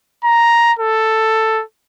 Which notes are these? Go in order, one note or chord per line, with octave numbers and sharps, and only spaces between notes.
A#5
A4